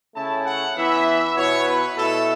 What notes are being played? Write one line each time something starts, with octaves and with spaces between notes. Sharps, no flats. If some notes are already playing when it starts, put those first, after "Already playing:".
C#3 A3 C#4 E4 A5
F#5
E3 B3 E4 E5
B2 B3 E4 C#5
B4
B2 A3 E4 A4